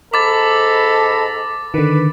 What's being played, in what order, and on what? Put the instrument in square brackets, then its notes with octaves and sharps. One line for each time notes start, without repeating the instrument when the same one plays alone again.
[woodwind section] G#2 A#5 B5 [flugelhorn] A4 [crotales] D6 A6
[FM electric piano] D3 D#3 [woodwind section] B4